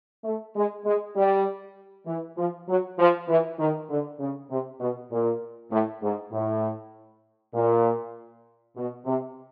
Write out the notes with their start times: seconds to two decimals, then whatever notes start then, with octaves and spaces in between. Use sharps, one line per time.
0.24 A3
0.56 G#3
0.85 G#3
1.16 G3
2.07 E3
2.38 F3
2.68 F#3
2.99 F3
3.28 E3
3.59 D#3
3.90 D3
4.20 C#3
4.51 C3
4.80 B2
5.12 A#2
5.71 A2
6.02 G#2
6.32 A2
7.54 A#2
8.77 B2
9.06 C3